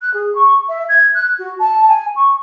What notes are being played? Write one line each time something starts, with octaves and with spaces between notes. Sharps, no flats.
F#6
G#4
C#6
E5
G#6
F#6
F#4
A5
G#5
C#6